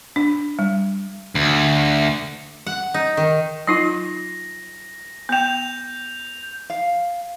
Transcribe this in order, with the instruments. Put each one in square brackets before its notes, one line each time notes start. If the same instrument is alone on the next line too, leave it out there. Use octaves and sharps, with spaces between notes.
[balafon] D4
G3
[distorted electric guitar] D2
[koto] F#5
D#4
D#3
[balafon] F#3 D#4 F4 [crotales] A#6
[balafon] B3 G5 [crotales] G6 F7
[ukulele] F5